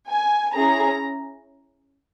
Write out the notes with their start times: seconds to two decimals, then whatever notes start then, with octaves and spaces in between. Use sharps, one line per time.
0.10 G#5
0.54 C#4 E4 G#4 A#5